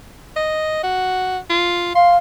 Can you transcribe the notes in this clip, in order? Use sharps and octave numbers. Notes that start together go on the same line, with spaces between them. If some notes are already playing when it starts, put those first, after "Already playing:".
D#5
F#4
F4
F5 C6